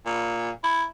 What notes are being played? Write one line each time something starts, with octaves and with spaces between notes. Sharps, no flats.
A#2
E4